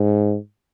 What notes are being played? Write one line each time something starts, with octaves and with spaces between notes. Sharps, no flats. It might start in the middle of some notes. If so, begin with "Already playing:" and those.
Already playing: G#2